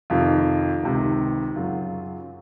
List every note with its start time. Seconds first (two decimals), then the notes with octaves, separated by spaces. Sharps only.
0.10 F2 C3 D#3 F4
0.83 C#2 C3 D#3
1.56 F#2 C#3 F#3 F4